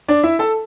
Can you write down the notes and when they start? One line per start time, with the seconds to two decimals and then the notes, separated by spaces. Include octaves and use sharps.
0.08 D4 D5
0.23 E4 E5
0.39 A4 A5